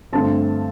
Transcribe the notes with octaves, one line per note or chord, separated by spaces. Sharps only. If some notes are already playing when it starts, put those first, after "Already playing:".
G2 D3 A3 C4 A5